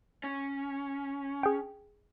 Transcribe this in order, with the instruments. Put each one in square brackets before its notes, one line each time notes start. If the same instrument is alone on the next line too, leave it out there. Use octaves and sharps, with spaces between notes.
[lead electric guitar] C#4
[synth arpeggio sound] G#4 G5